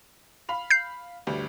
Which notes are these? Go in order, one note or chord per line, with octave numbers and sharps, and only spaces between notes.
F5 B5 F7
G6 C7
G1 D2 G3